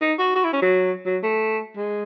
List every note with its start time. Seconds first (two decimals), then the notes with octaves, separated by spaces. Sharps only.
0.01 D#4
0.19 F#4
0.35 F#4
0.44 E4
0.53 C#4
0.61 F#3
1.06 F#3
1.23 A3
1.76 G#3